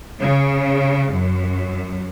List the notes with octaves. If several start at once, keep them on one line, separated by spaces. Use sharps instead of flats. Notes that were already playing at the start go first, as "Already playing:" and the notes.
C#3
F#2